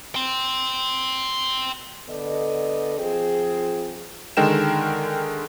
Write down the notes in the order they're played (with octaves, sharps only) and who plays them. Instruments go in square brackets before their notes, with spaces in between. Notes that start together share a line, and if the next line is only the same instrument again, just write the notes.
[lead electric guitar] G5 C6
[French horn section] D3 B3 A4 D5 D#5
F3 C4 F4 G#4
[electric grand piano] D3 D#3 G#3 A#4 G5 E7